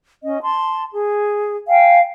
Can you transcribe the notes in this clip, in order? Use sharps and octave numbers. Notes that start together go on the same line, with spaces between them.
C#4 D#5
A5 C6
G#4
F5 G5 G#5